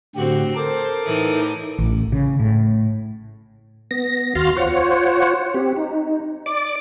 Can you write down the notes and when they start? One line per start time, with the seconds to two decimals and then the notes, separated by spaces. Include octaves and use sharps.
0.15 A2 D3 C4 F#4 G4
0.55 A4 A#4 C5 D6
1.05 A2 E3 D#4
1.78 A1
2.12 C#3
2.39 A2
3.91 B3 A#6
4.35 D#2 F#4 F5 C6 F6 A6
4.56 F4 C5 C#5 F#5
5.54 C4 G4
5.76 D#4
6.46 D5 D6